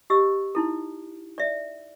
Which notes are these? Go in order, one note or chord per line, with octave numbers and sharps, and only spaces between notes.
G4 D#5 E6
D#4 E4 A4
D5 E5